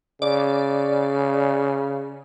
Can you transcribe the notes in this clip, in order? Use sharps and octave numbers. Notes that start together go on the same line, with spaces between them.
C#3 D5